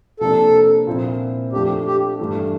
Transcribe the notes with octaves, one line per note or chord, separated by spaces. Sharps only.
C3 F3 A#3 D4 A4
A#2 F3 C4 E4 A#4
F3 A3 D4 G4
G4
G2 E3 A3